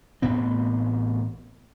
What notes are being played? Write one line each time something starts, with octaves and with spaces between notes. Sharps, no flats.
A1 A2 B3 C4